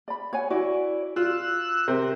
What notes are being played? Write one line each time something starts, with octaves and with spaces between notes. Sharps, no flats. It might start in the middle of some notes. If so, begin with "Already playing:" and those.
D5 B5
C#5 F#5 G#5
E4 F#4 D5
F4 E6 F#6
C3 A#4 C5